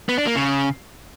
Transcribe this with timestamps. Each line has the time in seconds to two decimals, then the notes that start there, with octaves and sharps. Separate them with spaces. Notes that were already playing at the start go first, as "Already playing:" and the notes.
0.09 B3
0.18 D4
0.27 A#3
0.35 C#3